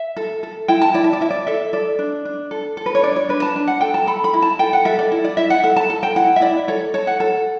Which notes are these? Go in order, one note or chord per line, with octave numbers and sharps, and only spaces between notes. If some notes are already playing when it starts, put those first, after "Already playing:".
Already playing: E5
A4
A4
E4 G5
A5
E4 D5
E5
D5
E4 E5
D5
A4 E5
A4 D5
D4
D4
A4
A4
B4
C#5
D4 D5
C#5
D4 B4
A5
D4
F#5
A4 G5
A5
A4 B5
B5
E4
A5
A4 G5
F#5
A4 E5
D5
E4
D5
E4 E5
F#5
A4 F#5
A5
A4 A5
G5
E4 F#5
E5
E4 D5
A4 C#5
A4 C#5
F#5
A4